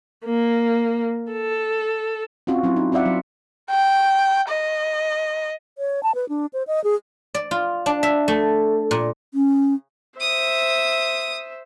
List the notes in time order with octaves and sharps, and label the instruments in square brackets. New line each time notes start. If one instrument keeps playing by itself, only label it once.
[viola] A#3
A4
[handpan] C4 C#4 F4 F#4
F#3 C4 E4
D#4
C4 F4 D5 E5 F#5
F#3
[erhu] G5
D#5
[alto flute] C#5
A5
B4
D4
C5
D#5
G#4
[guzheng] D5
F4
D4
E5
A3
A#2
[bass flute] C#4
[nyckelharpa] C5 E5 [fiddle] D#6